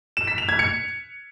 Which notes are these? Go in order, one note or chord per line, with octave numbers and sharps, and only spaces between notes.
E7
B6
F7
G#6
C#7